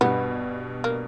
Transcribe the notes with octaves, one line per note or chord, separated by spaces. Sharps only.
G2 B2 B3
A#3